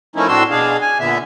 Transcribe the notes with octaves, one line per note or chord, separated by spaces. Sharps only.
F3 A3 A#3 C#4 D#4 E4
A2 C4 D4 F#4 C6 E6
B2 D4 G#4 F5
G#5
A#2 D3 B3 E5